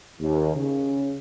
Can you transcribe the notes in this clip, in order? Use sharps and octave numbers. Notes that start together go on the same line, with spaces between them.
D#2
C#3